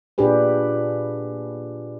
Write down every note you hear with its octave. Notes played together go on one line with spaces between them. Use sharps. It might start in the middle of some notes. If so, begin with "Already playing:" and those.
A#2 D4 F4 G4 G#4 B4